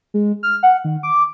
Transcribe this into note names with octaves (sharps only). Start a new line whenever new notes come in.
G#3
F6
F#5
D#3
D6